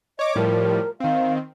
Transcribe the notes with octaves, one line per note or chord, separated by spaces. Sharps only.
C#5 D#5 D6
A2 F3 G3 A#4
D#3 C4 F5